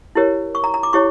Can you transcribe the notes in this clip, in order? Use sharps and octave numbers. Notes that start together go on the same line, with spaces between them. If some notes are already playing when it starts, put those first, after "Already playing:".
E4 G4 A#4 C#5
C#6
A#5
A#5
D6
E4 G4 C#5 C#6